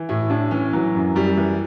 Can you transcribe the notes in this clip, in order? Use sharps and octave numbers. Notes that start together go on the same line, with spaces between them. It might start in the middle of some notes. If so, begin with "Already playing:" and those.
Already playing: E3
A2 E4
A2 D4
E3 C#4
E3 F#3
F#2
F#2 G3
E3